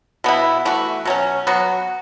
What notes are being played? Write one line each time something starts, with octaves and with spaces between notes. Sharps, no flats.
B2 B3 E4
E3 A3 F#4
B2 F#3 C#4
F#3 B3 F#4